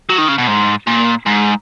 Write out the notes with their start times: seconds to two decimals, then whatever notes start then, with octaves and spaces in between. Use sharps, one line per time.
0.09 F#3
0.18 D#3
0.28 C#3
0.38 B2
0.47 G#2
0.87 A#2
1.26 G#2